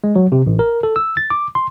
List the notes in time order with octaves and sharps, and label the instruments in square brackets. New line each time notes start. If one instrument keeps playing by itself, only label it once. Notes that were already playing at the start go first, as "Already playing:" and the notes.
[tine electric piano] G#3
F#3
C3
A1
A#4
A4
E6
A6
D6
C6